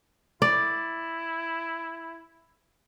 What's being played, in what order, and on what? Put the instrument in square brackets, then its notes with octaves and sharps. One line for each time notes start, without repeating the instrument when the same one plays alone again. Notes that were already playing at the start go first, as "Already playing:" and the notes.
[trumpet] E4 [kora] D5